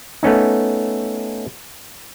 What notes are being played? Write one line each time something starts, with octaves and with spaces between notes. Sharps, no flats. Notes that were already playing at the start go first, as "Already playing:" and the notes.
A3 B3 C#4 D#4